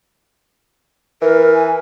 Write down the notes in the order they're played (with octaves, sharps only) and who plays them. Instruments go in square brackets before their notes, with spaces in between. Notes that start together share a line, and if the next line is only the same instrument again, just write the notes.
[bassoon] E3 [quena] A#4
[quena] G#5